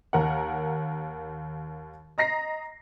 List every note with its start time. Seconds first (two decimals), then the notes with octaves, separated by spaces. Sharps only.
0.13 D#2 A#4 F#5
2.18 D#5 A#5 A#6 C7